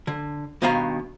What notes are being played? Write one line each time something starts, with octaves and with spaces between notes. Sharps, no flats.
D3
G2 B2 D#3 B3 F5 A#5